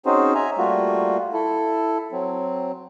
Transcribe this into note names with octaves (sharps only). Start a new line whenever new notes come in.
C4 C#4 D#4 F#4 G#4 C5
E5 G#5 A#5
G3 A3 A#3 F4 F#4
E4 A4
F#3 C4